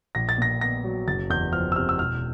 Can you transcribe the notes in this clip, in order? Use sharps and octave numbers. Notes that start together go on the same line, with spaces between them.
A#1 A#6
A6
A#2 A#6
B3 A#6
F#3
F#1 A6
E2 G6
F3 F6
E6
C3 F6
E6
E1 F6